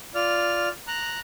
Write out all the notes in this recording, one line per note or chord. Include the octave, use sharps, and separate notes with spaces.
F4 D5 F6
A#5 F#6